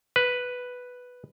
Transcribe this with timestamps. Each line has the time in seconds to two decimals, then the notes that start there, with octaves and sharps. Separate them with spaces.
0.16 B4